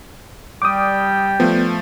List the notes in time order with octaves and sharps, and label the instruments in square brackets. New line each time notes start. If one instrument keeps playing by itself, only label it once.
[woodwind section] G3 G5 [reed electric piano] D6 D#6
[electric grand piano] F3 A3 [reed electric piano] B3